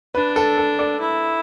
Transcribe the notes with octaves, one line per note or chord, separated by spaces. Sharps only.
D4 B4
A4
A4
A4 D5
E4